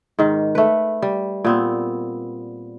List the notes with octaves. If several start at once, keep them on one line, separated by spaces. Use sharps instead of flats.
G#2 D#3
A3 B4
G3
A#2 B3 C4